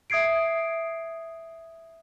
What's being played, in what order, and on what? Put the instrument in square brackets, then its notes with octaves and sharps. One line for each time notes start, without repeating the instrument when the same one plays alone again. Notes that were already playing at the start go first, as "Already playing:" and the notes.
[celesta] E5 D#6 G#6 C7 D7